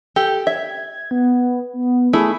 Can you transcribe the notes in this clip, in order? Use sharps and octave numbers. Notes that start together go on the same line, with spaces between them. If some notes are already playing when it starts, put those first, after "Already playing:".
G4 A4 G5
E5 G#6
B3
B3
A3 E4 G#4 B5